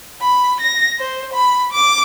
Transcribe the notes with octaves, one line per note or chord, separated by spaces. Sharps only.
B5
A#6
C5
B5
D6